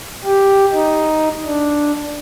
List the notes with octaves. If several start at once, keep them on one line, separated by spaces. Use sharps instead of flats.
G4
D#4
D4